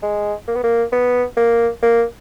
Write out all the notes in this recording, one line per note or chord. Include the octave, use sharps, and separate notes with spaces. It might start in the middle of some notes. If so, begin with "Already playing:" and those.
G#3
A#3
B3
A#3
B3
A#3
A#3